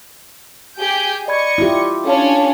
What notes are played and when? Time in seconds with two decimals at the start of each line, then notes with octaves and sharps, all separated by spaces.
0.79 G4 G#4 G6
1.28 D5 D#5 B5 C#6 G#6
1.58 E4 F4 G4
2.05 C#4 D4 A4 C#5 F5 A5